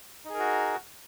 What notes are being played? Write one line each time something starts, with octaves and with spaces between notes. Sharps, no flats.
D#4 F#4 G#4 A#4